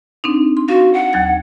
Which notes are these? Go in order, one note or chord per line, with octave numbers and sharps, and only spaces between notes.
C4 D4 D#4
C6
F#4 F5
F#5
D#2 F#3 G#6